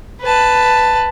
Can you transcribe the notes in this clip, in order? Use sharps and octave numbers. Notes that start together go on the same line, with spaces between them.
B4 A5